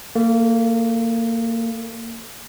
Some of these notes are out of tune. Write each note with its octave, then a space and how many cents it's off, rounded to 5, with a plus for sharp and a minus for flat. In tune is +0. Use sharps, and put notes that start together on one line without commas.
A#3 -25 A4 +0